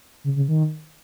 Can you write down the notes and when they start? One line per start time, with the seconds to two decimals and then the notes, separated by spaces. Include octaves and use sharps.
0.24 C#3
0.36 C#3
0.48 D#3